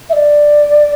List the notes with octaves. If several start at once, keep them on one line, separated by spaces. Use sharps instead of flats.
E5
D5